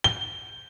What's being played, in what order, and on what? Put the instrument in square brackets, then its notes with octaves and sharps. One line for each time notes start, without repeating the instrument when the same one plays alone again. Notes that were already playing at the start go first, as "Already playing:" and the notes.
[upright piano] G7